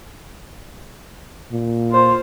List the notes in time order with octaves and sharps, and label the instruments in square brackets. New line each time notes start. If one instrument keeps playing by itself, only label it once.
[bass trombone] A#2
[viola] F4 C5